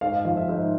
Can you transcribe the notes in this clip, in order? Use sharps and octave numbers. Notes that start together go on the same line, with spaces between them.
G#2 F5
F5
F3 F5
E5
G#2 E5